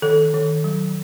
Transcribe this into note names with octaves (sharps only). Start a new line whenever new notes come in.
D#3 A4
D#3
F#3